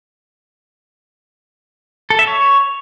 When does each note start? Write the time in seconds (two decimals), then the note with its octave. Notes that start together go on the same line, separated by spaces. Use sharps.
2.10 A4
2.19 E5
2.27 C#5